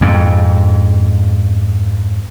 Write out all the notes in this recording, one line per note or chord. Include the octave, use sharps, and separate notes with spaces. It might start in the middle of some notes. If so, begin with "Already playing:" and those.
F2 G#2